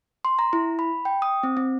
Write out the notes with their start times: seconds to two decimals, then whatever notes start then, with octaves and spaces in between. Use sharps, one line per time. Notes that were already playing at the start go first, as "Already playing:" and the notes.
0.25 C6
0.39 A#5
0.53 E4
0.79 B5
1.05 G5
1.22 D#6
1.43 C4
1.57 C4